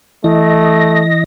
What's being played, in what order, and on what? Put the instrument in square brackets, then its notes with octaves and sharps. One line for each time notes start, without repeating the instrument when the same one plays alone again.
[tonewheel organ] E3 D#5 A#6 [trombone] A3